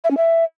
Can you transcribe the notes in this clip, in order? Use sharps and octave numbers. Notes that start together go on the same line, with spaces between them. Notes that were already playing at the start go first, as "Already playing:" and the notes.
E5
C#4
E5